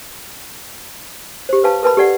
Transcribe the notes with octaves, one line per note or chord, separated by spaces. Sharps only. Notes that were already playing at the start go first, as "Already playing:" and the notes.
G4 C5
B4 F5 A5
A#4 B4 A5 B5
G4 A4 D5 F#5